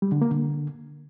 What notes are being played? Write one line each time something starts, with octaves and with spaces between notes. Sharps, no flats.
G3
D3
A#3
D3